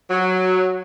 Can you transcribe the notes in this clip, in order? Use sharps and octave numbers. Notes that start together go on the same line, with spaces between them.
F#3